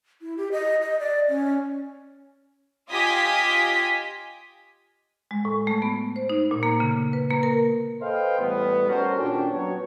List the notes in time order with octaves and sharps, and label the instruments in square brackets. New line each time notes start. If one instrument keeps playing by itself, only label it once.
[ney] E4
G4
D#5
D#5
D5
C#4
[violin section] F4 G4 D#5 G#5 D#6 B6
[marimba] G#3
A2
A3
B3
C5
D#4
A#2
A#3
C#3
B4
A#3
A#4
[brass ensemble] A4 B4 C5 D#5 F5 G5
E2 A2 G3 B3
G3 C#4 F#4 A4 A#4 C5
D#2 A#2 C#4 D4 G5
F#3 B3 C#5